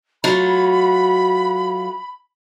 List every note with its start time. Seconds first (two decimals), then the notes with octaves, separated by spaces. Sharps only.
0.24 F#3 A3 F4 B5